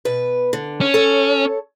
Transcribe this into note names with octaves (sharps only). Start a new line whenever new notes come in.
B2 B4
D3
C#4
A4 C#5